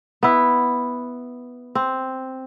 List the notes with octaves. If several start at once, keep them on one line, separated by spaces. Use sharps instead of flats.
B3 E4
C4